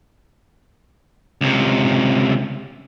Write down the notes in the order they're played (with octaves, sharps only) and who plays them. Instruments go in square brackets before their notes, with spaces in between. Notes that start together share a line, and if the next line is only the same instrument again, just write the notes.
[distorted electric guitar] C#2 C3